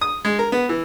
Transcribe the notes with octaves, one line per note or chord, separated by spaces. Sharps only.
D#6
G#3
A#4
B3
E3